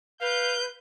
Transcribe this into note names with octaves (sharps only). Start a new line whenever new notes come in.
B4 F5 G6